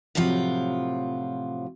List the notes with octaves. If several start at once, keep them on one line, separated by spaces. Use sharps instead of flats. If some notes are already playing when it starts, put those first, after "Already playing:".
A2 C3 F3 F#3 F4